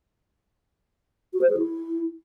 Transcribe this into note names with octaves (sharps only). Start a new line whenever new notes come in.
F#4
C5
G#4
E4